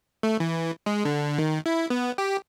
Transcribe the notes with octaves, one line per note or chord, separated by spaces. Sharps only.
A3
E3
G#3
D3
D#3
E4
B3
G4